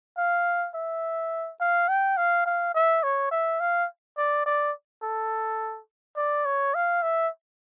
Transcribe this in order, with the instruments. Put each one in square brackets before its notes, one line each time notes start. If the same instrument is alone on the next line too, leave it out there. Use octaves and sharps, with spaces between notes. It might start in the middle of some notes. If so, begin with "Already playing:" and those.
[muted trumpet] F5
E5
F5
G5
F5
F5
E5
C#5
E5
F5
D5
D5
A4
D5
C#5
F5
E5